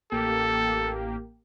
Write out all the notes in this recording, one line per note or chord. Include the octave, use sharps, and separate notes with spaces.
A1 A#3 G4 A4